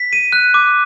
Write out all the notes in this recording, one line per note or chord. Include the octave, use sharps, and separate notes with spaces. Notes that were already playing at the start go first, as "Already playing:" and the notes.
Already playing: B6
D#7
F#6
D6